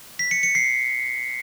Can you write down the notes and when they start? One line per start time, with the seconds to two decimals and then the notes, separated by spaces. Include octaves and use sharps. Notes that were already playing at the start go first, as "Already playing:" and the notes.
0.19 B6
0.31 C#7
0.43 C#7
0.55 C7